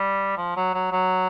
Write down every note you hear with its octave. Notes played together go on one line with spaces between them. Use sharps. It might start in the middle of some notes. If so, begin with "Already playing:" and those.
Already playing: G3
F3
F#3
F#3
F#3